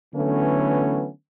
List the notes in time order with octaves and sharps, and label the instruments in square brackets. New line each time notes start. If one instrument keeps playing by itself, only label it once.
[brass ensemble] D3 E3 F#3 A3 B3 C#4